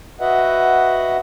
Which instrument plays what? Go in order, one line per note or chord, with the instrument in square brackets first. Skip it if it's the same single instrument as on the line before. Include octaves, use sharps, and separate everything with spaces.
[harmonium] F#4 B4 D#5 E5 F#5